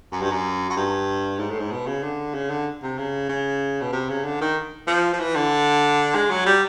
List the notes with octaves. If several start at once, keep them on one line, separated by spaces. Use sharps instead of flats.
F#2
G2
F#2
F#2
G2
G#2
A2
G#2
B2
C#3
D3
C#3
D3
C3
C#3
C#3
B2
C3
C#3
D3
D#3
F3
F3
E3
D3
G#3
F#3
G3